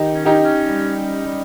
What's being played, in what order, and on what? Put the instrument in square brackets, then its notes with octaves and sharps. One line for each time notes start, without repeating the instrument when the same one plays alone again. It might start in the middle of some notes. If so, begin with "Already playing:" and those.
Already playing: [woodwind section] D#3 [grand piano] D#4 G4
[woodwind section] C#4
[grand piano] D#4 G4
[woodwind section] C#4
G3
C#4
G3